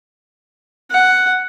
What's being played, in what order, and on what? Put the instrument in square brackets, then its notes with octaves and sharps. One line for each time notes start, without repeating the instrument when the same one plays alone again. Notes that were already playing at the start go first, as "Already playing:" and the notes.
[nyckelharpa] F#5